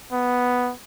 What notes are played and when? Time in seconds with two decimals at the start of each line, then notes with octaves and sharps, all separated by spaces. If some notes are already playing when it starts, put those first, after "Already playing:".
0.13 B3